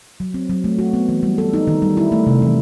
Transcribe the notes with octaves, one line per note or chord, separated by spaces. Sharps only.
F#3
C4
F#3
A3
F#4
B3
E3
G3
A4
D#4
D#3
G3
E4
A3
C3
E3